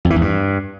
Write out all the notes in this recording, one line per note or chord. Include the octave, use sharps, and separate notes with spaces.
F2
E3
E2
G2